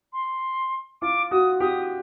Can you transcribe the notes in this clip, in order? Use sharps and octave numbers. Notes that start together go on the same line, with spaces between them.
C6
F4 D6
F#4 D#6
G4 D#6